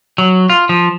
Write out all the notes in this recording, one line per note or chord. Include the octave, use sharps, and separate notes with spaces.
F#3
F4
F3